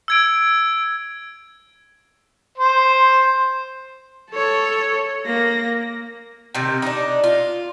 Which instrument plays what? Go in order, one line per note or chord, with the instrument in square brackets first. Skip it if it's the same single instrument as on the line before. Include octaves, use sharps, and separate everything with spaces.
[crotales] E6 G#6 D7
[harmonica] C5
[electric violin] A4 C#5
A#3 A#6
[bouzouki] C3 D#3
D4 D#4
F4